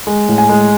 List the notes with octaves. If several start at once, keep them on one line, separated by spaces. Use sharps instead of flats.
G#3
A2
G#5
G#3